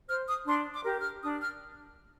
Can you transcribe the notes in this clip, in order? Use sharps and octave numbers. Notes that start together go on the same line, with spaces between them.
C5 F6
D#6
D4 C6
D6
G4 A#4
F6
D4 D#6
F6